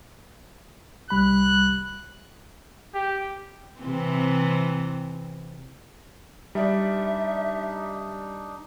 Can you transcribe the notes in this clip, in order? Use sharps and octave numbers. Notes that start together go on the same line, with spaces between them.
C2 G3 B5 F#6
G4
C3 E3 C4
G3 D4 D#4 D5 E5